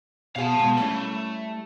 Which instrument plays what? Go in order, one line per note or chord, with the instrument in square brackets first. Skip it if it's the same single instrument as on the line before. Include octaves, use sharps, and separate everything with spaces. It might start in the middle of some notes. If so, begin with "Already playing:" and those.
[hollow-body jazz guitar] B2 G#4 [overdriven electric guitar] F5 A5
[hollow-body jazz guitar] B2 G#3
[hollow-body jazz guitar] G3 C#4 E4 [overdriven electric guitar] A3